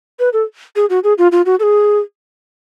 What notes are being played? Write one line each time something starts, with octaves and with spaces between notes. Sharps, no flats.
B4
A4
G#4
F#4
G#4
F4
F4
F#4
A4
G#4